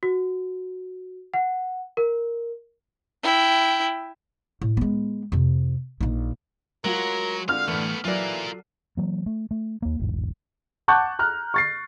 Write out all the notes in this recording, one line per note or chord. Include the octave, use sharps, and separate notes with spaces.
F#4
F#5
A#4
E4 G5
A2
G#3 B3
F2 C3
A#1 D#4
F#3 G#3 F4 F#4 A#4
D3 F5 F6
A2 E3 A3 B3
E3 F#3 F4 A4 A#4 D5
E3 F#3 A#3
A3
A3
D#2 A#3
E1 A1 G#2
F#5 A5 C#6 D6 F#6 G6
A#5 F6 F#6
C#6 A6 C7